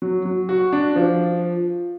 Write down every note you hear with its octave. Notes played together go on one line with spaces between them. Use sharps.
F#3
F#3
F#4
D4
F3